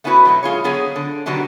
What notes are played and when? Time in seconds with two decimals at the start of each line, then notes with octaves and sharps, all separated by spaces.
0.04 A3 B3 C#4 E4 F#4 B4
0.25 B2 F#3 A3
0.43 G#3 F4 G#4 C#5
0.64 D3 F#3 B3 G#4 C#5
0.96 D3
1.26 B2 D3 D#3 F#3 G3 B3